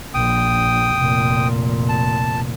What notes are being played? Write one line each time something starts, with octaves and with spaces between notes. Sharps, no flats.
A#1 G5 D#6
F1 A#2
A5